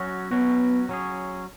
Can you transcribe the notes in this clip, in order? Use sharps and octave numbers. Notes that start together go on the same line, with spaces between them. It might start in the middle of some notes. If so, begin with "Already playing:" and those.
Already playing: F#3 C#4 F#4
F#3 B3 C#4 F#4
F#3 C#4 G#4